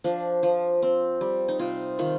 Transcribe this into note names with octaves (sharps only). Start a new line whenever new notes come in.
F3 D4
F3
C4
G3
D#4
C3 F4
D#3 F4